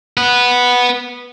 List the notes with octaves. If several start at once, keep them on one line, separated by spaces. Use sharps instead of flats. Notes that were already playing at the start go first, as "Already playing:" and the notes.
B4 F#5